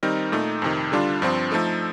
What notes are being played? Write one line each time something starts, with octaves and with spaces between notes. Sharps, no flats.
D#3 G3 C4 D#4 A#4
A#2 A3 D#4
F2 C3 D#3
D3 G3 D4 F4
G2 F3 C4
F3 A3 D#4 A4